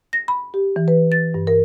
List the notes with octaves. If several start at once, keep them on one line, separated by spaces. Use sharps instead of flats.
A#6
B5
G4
E3
B4
A6
G2
A#4